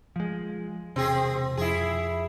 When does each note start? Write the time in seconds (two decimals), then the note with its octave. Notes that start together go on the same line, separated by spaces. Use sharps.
0.16 F3 G#3
0.96 E1 C3 C4 G#4
1.57 F2 E4 G#4